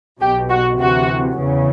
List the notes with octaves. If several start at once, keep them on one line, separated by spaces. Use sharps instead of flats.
B1 B2 G4
F#4
D2 C3 E3 F#4
E2 C#3 E3